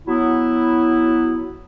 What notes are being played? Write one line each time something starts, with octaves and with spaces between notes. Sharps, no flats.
F#3 B3 E4